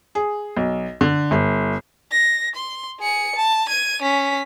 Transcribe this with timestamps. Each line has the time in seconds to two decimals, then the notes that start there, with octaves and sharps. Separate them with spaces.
0.15 G#4
0.57 B1
1.01 D3
1.31 G1
2.12 A#6
2.55 C6
2.99 G#4 C#7
3.35 A5
3.67 G#6 D#7
4.01 C#4 B6